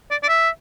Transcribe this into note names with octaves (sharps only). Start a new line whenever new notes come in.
D5
D5
E5